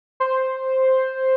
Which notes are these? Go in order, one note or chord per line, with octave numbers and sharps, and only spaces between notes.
C5